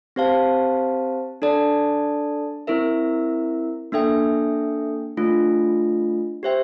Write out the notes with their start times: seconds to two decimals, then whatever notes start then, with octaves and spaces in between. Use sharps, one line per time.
0.16 C4 G4 C5 F5 A5
1.42 D4 A4 D5 A5
2.67 C4 E4 A#4 E5
3.92 A#3 D4 A4 E5 G5
5.17 A3 D4 F4
6.43 G4 C5 E5 G5